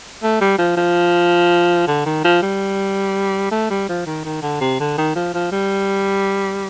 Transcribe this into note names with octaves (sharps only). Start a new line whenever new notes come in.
A3
G3
F3
F3
D3
D#3
F3
G3
A3
G3
F3
D#3
D#3
D3
C3
D3
D#3
F3
F3
G3